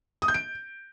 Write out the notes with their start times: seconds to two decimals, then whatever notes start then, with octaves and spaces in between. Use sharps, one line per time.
0.22 D#6
0.28 G6
0.34 D7